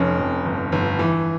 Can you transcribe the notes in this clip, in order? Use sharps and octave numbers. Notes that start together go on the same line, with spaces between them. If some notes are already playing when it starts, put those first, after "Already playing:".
Already playing: F1 F2 C#4
F2
G1
G1
E3